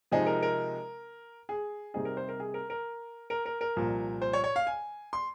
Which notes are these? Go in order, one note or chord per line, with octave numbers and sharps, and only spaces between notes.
C3 F3 G#3 C4 D#4 G#4
A#4
A#4
G#4
C3 G3 C4 D#4 G#4
A#4
C5
A#4
G#4
A#4
A#4
A#4
A#4
A#4
C2 A#2 F3
C5
C#5
C#5
F5
G#5
C6